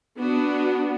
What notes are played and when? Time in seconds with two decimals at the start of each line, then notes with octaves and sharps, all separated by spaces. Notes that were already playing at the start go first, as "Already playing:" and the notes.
0.18 B3 D4 F#4